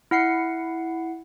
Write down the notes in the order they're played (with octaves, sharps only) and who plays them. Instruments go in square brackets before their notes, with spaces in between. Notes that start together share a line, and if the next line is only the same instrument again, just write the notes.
[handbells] E4 F#5 C7 C#7